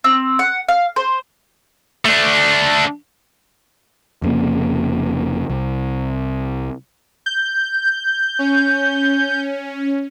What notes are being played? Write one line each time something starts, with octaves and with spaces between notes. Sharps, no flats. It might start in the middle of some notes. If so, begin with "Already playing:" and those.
C4
F#5
F5
C5
A3 D4
F1 F2 C#3 A#3
C2
G6
C#4